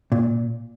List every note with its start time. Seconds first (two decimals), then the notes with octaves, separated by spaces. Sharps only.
0.12 A#2